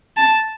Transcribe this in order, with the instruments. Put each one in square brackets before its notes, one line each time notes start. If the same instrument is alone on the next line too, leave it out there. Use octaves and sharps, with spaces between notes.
[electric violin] A5